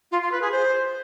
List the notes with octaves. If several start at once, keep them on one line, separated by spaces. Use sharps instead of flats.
F4
F4
B4
G#4
C5